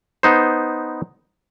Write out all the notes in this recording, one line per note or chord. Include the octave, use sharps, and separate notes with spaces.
B3 D#4 C5